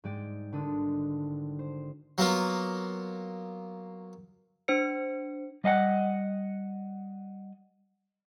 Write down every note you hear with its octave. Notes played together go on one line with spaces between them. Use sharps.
G#2 G3 G#3 D5 G5
G#1 D3 D4 A4 D#6
C5
F#3 A#3 B3 F4
D4 C5 C#7
G3 D#5 F5 F#5